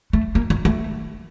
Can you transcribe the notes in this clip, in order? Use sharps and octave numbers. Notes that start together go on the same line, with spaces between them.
A3
A#3
A#3
A3